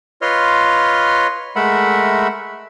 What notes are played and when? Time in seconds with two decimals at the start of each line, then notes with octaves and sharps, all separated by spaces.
0.22 F4 B4 C#5 D#5 C6 F6
1.56 G#3 A3 A#4 E5 F#5 B5